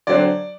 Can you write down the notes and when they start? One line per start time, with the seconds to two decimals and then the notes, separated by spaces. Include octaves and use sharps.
0.07 D3 F#3 C4 D5